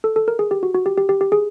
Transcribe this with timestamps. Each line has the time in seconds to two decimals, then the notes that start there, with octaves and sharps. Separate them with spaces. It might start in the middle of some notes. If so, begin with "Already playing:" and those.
0.04 A4
0.16 A4
0.28 A#4
0.39 G#4
0.51 G4
0.63 F#4
0.75 F#4
0.86 G4
0.98 G4
1.09 G4
1.21 G4
1.32 G#4